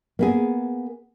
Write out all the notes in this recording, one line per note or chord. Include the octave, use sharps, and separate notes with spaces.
A#3 B3 G#4